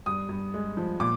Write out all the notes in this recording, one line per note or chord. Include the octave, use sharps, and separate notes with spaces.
G2 D#6
G2
G#3
F3
A#2 D6